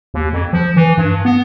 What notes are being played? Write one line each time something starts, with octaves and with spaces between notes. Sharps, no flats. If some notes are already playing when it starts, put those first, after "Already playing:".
D#2
F2
F3
E3
G2
B3